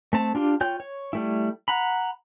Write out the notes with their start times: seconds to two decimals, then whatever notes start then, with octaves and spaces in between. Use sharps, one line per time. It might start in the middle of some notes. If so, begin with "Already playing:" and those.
0.13 A3 C4 A5
0.35 D4 F4 G4
0.61 F4 C#5 G5 G6
0.80 C#5
1.13 G3 A3 E4
1.68 F#5 A#5 B5